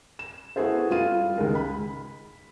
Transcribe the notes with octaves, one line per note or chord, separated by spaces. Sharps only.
E7
B3 E4 F#4 G#4 A4 C5
G3 F4 D#7
C#2 D#3 G#3 A#4
B5